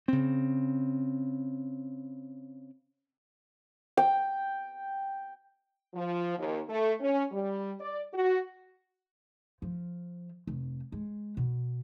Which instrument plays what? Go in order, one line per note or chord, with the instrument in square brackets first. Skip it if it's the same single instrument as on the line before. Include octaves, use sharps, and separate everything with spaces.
[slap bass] C#3 C4
[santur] G5
[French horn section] F3
D#2
A3
C#4
G3
D5
F#4
[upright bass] F3
F1
G#3
B2